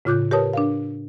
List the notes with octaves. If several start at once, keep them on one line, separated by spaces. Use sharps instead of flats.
A2 C#3 F4 D6 F#6 G6
G4 A#4 B4 C#5 A5 D#6
D4 A#4 F5